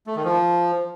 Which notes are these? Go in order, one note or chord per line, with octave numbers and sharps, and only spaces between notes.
A3
D#3
F3